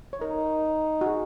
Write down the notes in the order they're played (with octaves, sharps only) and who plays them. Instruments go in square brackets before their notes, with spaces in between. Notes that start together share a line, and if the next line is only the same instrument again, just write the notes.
[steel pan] C#5
[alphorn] D#4 [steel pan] A#4
[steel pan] F#4
G#4